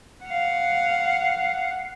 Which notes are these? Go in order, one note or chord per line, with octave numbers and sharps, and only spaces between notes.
F5 F#5